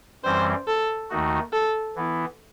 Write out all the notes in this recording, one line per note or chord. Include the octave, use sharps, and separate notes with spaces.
F#2 E3 G3 C4 C5
A4
D#2 D#3 A3 D#4 F#4
A4
E3 B3 E4